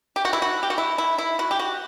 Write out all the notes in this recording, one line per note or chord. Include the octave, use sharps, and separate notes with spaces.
G4
F#4
E4
F#4
G4
F#4
E4
E4
E4
F#4
G4
F#4